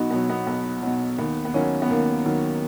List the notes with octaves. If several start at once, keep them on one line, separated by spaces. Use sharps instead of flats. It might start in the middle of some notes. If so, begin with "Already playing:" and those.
Already playing: B1 B3 D#4 F#4
B2 F#3 B3
B3
B1 B3
B2 F#3
D#2 B3
B3
D#3 F#3 A#3 C#4
B3
D#2 A#3
D#3 F#3